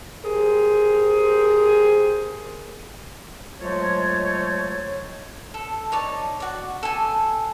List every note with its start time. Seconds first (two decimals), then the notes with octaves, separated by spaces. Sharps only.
0.23 G4 G#4 A#4 C5
3.60 F3 F#3 G#3 A3 A4 C#5
5.54 A4
5.92 D#4 C#5 D5 A5
6.40 F#4 D5
6.83 A4 G#5